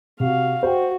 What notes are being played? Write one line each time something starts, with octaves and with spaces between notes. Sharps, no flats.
C3 F#4 F5
F#4 C5 G5